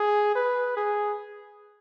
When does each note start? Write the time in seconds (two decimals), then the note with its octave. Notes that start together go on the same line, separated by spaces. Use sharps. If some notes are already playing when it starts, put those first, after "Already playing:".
Already playing: G#4
0.36 B4
0.77 G#4